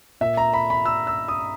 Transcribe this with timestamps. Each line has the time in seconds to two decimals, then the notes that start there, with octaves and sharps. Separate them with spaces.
0.21 A#2 E5
0.37 A#5
0.54 B5
0.70 B5
0.85 E6
1.07 E6
1.28 D#6